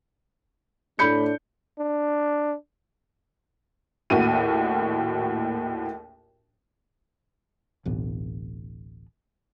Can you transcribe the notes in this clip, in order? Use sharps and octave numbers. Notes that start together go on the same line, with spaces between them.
A2 D4 B5 G6 C#7
D4
A#1 D#2 A2 F#4 D#7
D1 A1 B2